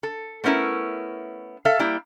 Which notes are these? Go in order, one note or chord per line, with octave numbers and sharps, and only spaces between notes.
A4
A3 B3 C#4 E4 A#4
A4 E5 F5
G3 A#3 E4 G4